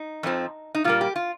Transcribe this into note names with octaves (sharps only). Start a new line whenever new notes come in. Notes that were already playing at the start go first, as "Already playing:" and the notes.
Already playing: D#4
F2 F3 C4
D#4
A#2 G3 A#3 F4
G4
F4